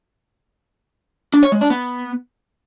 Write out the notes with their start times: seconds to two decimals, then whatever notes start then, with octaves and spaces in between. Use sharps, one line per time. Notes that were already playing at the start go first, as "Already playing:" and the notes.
1.34 D4
1.43 C#5
1.52 G#3
1.61 D4
1.70 B3